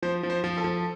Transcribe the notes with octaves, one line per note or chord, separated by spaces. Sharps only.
F3 C5
F3
C5
F3
A4
F3